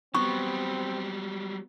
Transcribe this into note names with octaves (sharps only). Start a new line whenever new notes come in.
F#3 G3 B3 C4 C#6